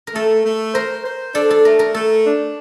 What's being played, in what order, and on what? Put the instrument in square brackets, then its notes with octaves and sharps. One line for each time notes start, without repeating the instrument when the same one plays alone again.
[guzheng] A#4
[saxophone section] A3 [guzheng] A4
[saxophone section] A3
[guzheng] A#4 [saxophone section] C5
[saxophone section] C5
[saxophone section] D4 [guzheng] A4
[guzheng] A4
[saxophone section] A3 [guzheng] A#4
[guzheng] A#4
[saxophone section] A3 [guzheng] A4
[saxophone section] D4